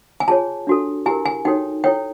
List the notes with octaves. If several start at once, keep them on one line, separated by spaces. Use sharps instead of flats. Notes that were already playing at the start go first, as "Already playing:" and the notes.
G#5
F4 G#4 C#5 A5
D4 F#4 A4
E4 G4 A#4 G#5
G#5
D#4 F#4 A4 C#5 G5
E4 A4 C#5 G5